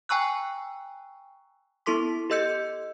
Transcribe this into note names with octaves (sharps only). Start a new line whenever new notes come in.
G5 G#5 A#5 C#6 E6 F#6
B3 E4 A4 C6 D6 B6
G4 A4 D#5 E6 G6 C#7